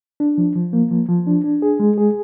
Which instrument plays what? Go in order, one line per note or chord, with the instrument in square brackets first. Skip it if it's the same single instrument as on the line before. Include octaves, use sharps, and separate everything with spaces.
[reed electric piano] D4
F3
F3
A#3
F3
F3
D4
D4
G#4
G#3
G#4